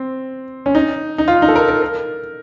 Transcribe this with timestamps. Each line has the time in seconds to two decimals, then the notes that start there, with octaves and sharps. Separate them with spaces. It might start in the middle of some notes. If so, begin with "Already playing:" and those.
Already playing: C4
0.66 C#4
0.75 D#4
1.18 D#4
1.28 F4
1.42 D#4
1.48 A4
1.56 A#4
1.68 A#4
1.82 A#4